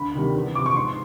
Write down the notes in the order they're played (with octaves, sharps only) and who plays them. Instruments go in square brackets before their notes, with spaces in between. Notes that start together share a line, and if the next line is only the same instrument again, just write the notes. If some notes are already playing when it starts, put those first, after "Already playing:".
Already playing: [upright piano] D2 B5
C3 D#3 G3
E2
C3 F3 D6
C#6
G#2 C6